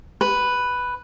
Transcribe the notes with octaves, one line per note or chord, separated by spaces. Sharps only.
B4